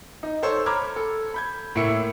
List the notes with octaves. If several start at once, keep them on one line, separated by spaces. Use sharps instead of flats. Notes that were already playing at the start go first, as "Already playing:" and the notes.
D#4
A4 C5 C#5 E6
A#5 B5 D6 F6 G#6
A4
B5 G6 G#6
A2 A#3 E4 E5 C#7